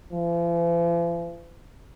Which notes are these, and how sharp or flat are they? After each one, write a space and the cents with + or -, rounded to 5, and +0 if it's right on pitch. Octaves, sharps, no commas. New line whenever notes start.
F3 -45